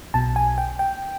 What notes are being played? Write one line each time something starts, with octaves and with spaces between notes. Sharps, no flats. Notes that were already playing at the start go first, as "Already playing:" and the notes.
B1 B2 A5
G#5
G5
G5